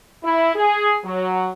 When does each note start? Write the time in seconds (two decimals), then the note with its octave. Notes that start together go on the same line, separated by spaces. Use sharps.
0.24 E4
0.56 G#4
1.05 F#3